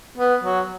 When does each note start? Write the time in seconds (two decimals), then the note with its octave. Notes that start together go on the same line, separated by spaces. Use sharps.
0.18 B3
0.43 F#3